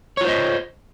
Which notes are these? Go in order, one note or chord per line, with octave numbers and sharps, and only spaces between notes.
F4 C5 C#5 D#5